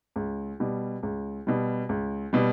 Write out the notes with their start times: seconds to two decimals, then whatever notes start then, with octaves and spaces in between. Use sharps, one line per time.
0.16 C#2
0.60 B2 G3
1.03 C#2
1.47 B2 G3
1.89 C#2
2.33 B2 G3